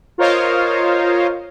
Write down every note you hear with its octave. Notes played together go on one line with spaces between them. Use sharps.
F4 A#4 C5 C#5 D#5 F5